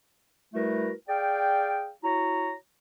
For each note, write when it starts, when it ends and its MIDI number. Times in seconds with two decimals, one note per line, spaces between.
0.54 0.92 55
0.54 0.92 57
0.54 0.92 64
0.54 0.92 66
0.54 0.92 70
0.54 0.92 71
1.09 1.91 68
1.09 1.91 74
1.09 1.91 77
1.09 1.91 79
2.04 2.53 64
2.04 2.53 66
2.04 2.53 73
2.04 2.53 82